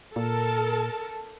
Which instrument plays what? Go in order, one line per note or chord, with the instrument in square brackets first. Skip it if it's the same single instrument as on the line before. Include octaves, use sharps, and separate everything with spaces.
[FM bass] A#2 [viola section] A4 A#4 A5